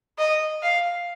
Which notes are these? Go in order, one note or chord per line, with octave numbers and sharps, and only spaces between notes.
D#5
F5